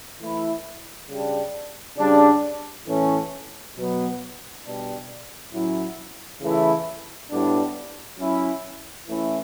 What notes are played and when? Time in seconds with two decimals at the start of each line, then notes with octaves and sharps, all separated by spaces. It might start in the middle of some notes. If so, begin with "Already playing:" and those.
0.20 E3 A3 E4
1.09 C#3 G3 D4
1.98 C#3 G3 D4
2.86 A2 E3 A3 C#4
3.75 B2 F#3 B3
4.63 B2 G3 D4
5.52 A2 F#3 C#4 E4
6.41 C#3 E3 A3 E4
7.30 A2 G3 B3 D4
8.18 F#3 C#4 E4
9.07 E3 A3 C#4 E4